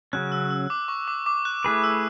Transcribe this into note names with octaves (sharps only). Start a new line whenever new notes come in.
C#3 F#3 C#4 F#6
E6
E6
D6
C#6
D6
D6
F#6
A3 E4 G#4 B4
E6